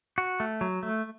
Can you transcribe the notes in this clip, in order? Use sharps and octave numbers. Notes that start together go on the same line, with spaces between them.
F#4
A3
F#3
A3